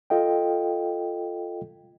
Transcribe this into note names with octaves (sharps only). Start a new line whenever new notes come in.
F4 A4 D#5 F5 G5